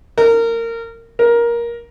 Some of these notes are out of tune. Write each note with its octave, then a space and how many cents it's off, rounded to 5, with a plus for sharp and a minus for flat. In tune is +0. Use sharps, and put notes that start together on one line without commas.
A#4 -20
A#4 +15